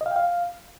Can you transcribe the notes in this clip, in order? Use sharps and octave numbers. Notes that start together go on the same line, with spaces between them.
D#5
F5
G5
F5